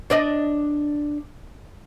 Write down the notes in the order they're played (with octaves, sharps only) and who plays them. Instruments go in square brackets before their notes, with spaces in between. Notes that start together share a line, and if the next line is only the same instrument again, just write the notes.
[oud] D4 D5 D#5